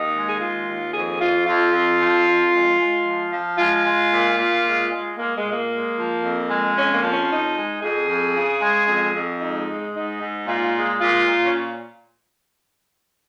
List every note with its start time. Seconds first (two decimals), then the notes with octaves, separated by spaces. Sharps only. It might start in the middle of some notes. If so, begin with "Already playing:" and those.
Already playing: D#2 D#4
0.14 G#3
0.28 G#4
0.40 D#2 F4
0.67 D#2
0.93 F2 G#4
1.20 F2 F4
1.46 F2 F4
1.72 F2
2.00 F3
2.26 F2
2.52 G#3
2.79 G#3
3.05 F3
3.32 F3
3.58 G#3 F4
3.85 G#3
4.12 A#2
4.38 A#2
4.65 G#3
4.92 G#3
5.18 G#3 A#3
5.36 G#3
5.44 A#2
5.53 A#3
5.70 G#3
5.98 F3
6.23 F2
6.51 G#3
6.76 F2 C#4
6.95 A#3
7.03 F3
7.12 C#4
7.30 F2 D#4
7.56 G#3
7.82 F2 G#4
8.09 F2
8.36 C#3
8.62 G#3
8.88 F2
9.16 F2
9.41 G#2 D#4
9.68 G#3
9.94 G#2 D#4
10.22 G#2
10.47 A#2 F4
10.75 G#3
11.01 A#2 F4
11.27 A#2
11.42 C#4